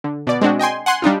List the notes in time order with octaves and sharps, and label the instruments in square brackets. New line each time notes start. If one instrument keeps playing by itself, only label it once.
[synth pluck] D3
B2 D5
G#3 C4 D4 F#4
D#5 G5 G#5 C6
F#5 G#5 C6 F#6
G3 D4 D#4 F4